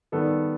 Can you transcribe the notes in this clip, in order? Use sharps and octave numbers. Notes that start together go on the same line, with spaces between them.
D#3 G3 B3 A4